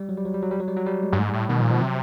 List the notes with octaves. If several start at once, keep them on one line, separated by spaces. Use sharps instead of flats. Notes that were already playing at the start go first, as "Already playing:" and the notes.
Already playing: G3
F#3
G3
F#3
G3
F#3
G3
F#3
G3
F#3
G3
G#3
G2
G#2 A3
G3
A2
B2 D#3
A#2 F3
B2 F3
C3 F#3